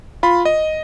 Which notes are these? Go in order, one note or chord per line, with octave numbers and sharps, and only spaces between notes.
F4 B5
D#5